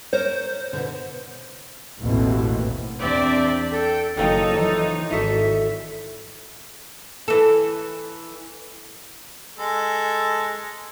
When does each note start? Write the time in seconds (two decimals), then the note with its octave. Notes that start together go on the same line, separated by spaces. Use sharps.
0.13 A#4 C5 C#5
0.73 B2 D3
2.02 A1 D#2 B2 E3 C4
3.01 E2 C4 D4 D5 E5
3.72 A4 G5
4.17 F#1 D#3 F3 D#4 A4 G5
4.51 E3 F3 C#5
5.11 G#1 E4 F#4 A4 E5
7.28 E3 A4
9.58 G#3 A4